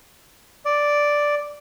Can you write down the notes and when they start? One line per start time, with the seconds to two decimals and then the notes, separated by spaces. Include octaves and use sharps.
0.65 D5